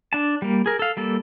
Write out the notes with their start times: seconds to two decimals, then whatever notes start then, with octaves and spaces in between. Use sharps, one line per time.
0.13 D4 A5
0.42 G3 A#3
0.66 G#4 A#4
0.79 A4 F5
0.97 G3 A#3 A4